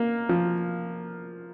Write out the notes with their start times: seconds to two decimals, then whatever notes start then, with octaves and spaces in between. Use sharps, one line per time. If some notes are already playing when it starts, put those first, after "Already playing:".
Already playing: A#3
0.29 F3